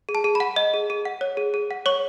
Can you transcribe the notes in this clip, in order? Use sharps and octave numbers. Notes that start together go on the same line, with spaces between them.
G#4
A5
G#4
B5
F#5
D#5
G#4
G#4
F#5
C#5
G#4
G#4
F#5
C#5 C#6